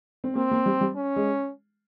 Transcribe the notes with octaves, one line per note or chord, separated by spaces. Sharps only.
C4
A#3 C4
A#3
G3
G3
C#4
G#3